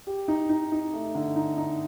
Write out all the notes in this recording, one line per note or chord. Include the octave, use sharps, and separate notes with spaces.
G4
D#4
D#4
D#4
A3
D3
D#4
D#4